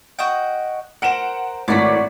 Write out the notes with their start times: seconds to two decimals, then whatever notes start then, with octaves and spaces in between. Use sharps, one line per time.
0.19 F#4 D#5 G5
1.02 A#4 C5 F#5 D7 E7
1.68 G#1 A2 F#4 D5 B6